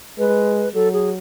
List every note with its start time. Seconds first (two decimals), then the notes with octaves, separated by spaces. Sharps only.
0.18 G#3 B4
0.74 F#3 A4
0.93 G#4